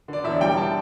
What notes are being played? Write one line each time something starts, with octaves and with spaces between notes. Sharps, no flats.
D3 D5
E1 E5
G3 G5
D3 A5